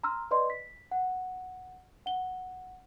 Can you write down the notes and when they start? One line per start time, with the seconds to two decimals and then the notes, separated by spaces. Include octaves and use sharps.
0.04 A#5 C6 E6 F6
0.31 B4 D5 D#5 C6
0.50 B6
0.91 F#5
2.06 F#5 G7